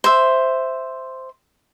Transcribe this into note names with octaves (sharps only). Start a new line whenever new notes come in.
C5 E5